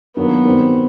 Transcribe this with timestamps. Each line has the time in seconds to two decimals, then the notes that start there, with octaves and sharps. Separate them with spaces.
0.17 G2 D#3 F#3 A#3 B3
0.45 D#3 G3 C4